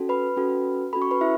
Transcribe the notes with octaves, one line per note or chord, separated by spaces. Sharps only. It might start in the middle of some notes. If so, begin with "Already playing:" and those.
Already playing: C#4 F#4 A4
B4 B5
C#4 F#4 A4
C#4 F#4 A4 B5
C#6
B4 B5
E4 E5